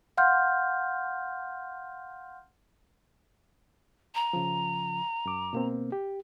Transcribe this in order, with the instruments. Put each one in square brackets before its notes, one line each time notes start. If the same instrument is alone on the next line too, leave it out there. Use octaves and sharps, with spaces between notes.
[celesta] F5 F#5 C6 F6 G6
[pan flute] A#5
[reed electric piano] C#3 F3
F#2 D6
B2 A#3 C4
G4